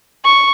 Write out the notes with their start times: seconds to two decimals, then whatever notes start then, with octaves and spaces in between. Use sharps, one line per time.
0.24 C#6